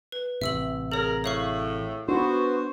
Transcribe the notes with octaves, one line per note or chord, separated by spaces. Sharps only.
B4
A1 C3 E5 E6 F#7
G#4 A#4 C#5
A2 C#5 F5 C#6
B3 D4 F#4 C5